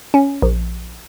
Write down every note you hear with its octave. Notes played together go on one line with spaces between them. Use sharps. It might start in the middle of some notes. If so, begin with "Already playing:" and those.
C#4
A#1